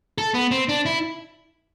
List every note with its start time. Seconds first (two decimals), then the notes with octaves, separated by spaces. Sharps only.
0.18 A4
0.34 B3
0.51 C4
0.69 D4
0.86 E4